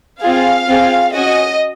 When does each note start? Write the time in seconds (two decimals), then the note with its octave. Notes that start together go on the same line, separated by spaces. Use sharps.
0.22 C4 F4 G#4 F5
0.68 C4 F4 G#4
1.13 C#4 F#4 D#5